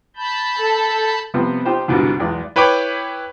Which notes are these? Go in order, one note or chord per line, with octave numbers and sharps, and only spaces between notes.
A5 B5 G6
A4
C3 F3 G3 B3 C4
D#4 F4 G4 C5
C2 G#2 B2 D3 E3 G3
B1 E2 G#3 D5
E4 B4 C#5 G5 B5 D6